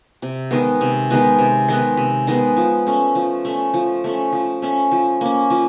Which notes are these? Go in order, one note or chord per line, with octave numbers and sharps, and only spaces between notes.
C3
D#3 G#3 B3
C3
D#3 G#3 B3
C3
D#3 G#3 B3
C3
D#3 G#3 B3
F3
A3 C#4
F3
A3 C#4
F3
A3 C#4
F3
A3 C#4
F3
A#3 C#4
F3